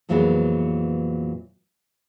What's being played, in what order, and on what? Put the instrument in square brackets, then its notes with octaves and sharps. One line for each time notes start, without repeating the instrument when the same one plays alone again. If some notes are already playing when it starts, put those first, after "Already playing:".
[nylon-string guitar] F2 A#2 E3 F#3 G#3 B3